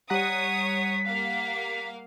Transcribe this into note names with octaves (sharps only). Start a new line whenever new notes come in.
G3 C#5 F#5 A#5 D#6 B6
A#3 F5